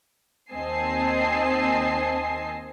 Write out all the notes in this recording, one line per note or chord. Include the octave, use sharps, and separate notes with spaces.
D#2 C4 D#5 G#5 A5 C7